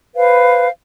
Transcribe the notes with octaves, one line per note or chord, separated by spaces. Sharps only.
B4 C5 F5